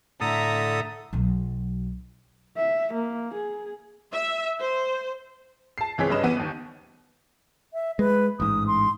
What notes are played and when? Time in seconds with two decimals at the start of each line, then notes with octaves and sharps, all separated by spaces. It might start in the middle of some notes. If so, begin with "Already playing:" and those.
0.21 A2 D3 A4 E5 A#5 D#6
1.13 B1 F#3
2.57 E5
2.94 A#3
3.35 G#4
4.12 E5
4.60 C5
5.78 A5 C7
5.98 C#2 E3 C4 G#4 C#5 B6
6.10 G2 C#4 B4 D#5 E7
6.23 E3 B3 D#7
6.37 G1 D#2
7.73 E5
7.99 G#3 B4
8.40 A1 G#2 D#6
8.67 C6